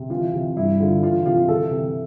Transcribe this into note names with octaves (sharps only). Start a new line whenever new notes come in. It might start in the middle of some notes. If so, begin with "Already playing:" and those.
Already playing: C3
E3 F4
C3
G2 E4
D3 F4
E3 F4
C3 F4
E3 A4
C3